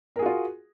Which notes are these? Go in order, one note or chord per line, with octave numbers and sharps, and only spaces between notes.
F4 F#4 G#4 A#4